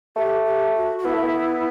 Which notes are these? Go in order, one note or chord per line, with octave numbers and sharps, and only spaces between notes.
A3 G4
G4
F#4
F#4
B3 E4
A3
B3